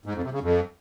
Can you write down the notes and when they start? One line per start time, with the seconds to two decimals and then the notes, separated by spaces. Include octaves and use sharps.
0.06 G#2
0.15 F2
0.24 C3
0.33 C#3
0.41 F2